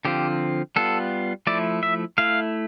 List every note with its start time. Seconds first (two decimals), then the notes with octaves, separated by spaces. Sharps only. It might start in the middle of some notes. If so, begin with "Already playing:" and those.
0.05 D3 F3 C4 F4 G4
0.76 G3 B3 F4 A4
1.47 F3 A3 E4 D5
1.83 E5
2.18 A3 E4 F5